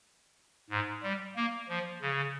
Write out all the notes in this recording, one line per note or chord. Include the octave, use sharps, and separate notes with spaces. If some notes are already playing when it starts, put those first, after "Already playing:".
G#2
G3
A#3
F3
C#3